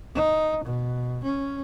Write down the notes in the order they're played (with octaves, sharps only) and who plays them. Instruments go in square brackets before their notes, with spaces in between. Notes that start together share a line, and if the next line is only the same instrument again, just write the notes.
[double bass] D#4
B2
C#4